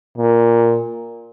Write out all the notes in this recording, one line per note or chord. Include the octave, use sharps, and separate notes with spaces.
A#2